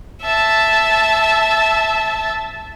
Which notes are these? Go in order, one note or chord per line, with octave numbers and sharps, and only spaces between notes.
E5 A5